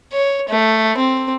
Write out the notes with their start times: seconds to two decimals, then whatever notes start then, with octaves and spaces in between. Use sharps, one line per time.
0.13 C#5
0.49 A3
0.97 C4